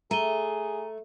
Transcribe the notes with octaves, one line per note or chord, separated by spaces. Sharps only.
A3 G#4 A#5 D#7 G7